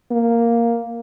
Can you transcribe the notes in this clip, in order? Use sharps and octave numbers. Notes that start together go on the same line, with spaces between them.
A#3